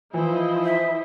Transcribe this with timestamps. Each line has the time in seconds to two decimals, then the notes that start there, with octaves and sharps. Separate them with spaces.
0.14 E3 F3 E4 C5 D#5
0.65 E5